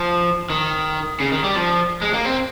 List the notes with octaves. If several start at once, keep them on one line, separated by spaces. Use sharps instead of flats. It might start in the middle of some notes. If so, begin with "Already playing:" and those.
Already playing: F3
D#3
C#3
D#3
G3
F3
G#3
A#3
C4